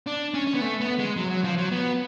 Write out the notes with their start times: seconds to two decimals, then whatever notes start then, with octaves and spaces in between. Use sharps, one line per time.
0.07 D4
0.34 C#4
0.47 C#4
0.54 B3
0.61 A3
0.81 B3
0.99 G#3
1.17 F#3
1.31 F#3
1.44 F3
1.58 F#3
1.72 B3